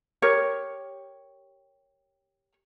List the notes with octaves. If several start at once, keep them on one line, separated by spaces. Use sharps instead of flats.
G4 A#4 C#5